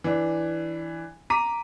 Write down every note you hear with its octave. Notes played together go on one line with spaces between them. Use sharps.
E3 D4
A#5 D6 B6 D#7